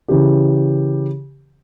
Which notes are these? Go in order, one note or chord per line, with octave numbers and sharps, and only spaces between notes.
C#3 E3 G4